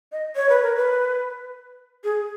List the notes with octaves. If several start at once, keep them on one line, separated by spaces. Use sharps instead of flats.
D#5
C#5
B4
A#4
B4
G#4